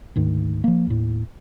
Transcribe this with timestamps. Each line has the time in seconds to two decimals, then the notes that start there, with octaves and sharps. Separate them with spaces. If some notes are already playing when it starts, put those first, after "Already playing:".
0.16 D2 G#2 D#3
0.64 F3 A#3
0.87 D#2 A2